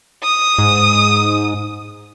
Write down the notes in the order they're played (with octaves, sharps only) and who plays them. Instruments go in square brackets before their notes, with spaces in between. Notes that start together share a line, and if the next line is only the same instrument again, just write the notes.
[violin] D#6
[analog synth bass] G#2